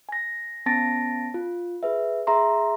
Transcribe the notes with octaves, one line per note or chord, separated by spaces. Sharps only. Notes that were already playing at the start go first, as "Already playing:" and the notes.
G#5 A#6
B3 C#4 A5 A6 A#6 D7
F4
G#4 B4 E5
G#4 E5 A#5 C6